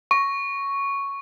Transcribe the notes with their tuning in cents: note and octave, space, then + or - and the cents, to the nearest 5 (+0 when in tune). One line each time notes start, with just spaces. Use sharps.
C#6 +0